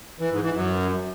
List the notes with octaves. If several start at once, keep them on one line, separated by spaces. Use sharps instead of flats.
E3
G#2
E3
F#2